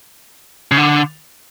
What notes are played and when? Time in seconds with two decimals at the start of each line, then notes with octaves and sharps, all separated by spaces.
0.72 C#3
0.77 D3